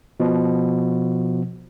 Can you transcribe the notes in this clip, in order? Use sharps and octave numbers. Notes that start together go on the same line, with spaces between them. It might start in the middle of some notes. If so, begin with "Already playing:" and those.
B2 F3